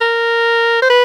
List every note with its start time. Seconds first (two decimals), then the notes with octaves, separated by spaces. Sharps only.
0.01 A#4
0.82 C5
0.90 B4